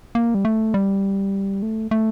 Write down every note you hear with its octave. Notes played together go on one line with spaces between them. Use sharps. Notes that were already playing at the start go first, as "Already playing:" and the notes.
A#3
G3
A3
G3
A3
A3